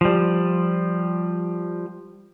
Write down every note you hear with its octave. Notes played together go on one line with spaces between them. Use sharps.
F3 G3